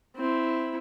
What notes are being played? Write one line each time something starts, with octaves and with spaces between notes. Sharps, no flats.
C4 E4